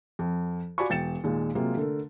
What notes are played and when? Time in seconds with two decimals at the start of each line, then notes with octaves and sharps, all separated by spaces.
0.19 F2
0.78 F4 F#4 D5 G#5 B5 C#6
0.90 E1 G5 A6 C#7 E7
1.24 D#2 A#2 G#3
1.55 C3 F#3 G#3 A#3 F4
1.77 D3 A3 A#4